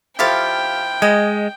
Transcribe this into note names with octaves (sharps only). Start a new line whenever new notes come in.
F3 E4 G4 A4 F5 G5
G#3 D#5